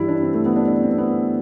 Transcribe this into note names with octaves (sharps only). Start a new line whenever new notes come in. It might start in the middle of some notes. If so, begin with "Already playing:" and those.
Already playing: G2 E3 G3 E4
D4
C4
A3
B3
D4
D4
C4
B3